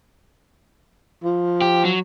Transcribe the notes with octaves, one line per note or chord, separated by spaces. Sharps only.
F3
G4
F#3